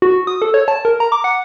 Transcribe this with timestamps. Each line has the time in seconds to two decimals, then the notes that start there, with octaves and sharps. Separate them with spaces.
0.02 F#4
0.27 D#6
0.42 A4
0.54 C#5
0.68 A5
0.85 A#4
1.00 A#5
1.12 D6
1.24 F#5